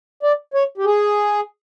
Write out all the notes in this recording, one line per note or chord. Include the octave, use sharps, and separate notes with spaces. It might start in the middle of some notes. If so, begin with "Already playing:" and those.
D5
C#5
G4
G#4